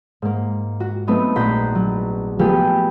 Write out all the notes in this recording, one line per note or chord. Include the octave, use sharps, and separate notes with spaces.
G#2 A#3
F#4
F#3 A3 B3 C4 D#4
A#1 F#5 A#5 C6 G6 B6
F#3
F3 F#3 A3 B3 G4 G#4